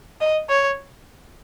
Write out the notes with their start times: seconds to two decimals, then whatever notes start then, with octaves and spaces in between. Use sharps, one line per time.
0.21 D#5
0.49 C#5